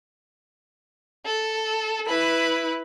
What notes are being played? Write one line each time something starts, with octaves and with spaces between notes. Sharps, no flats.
A4
E4 B4 B5